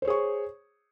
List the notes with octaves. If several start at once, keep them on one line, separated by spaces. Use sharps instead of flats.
G#4 C5 C#5 C#6